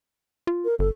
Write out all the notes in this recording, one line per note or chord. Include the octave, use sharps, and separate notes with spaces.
F4
A#4
G1 A4